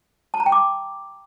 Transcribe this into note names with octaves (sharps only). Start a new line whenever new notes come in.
A5
A#5
G5
D6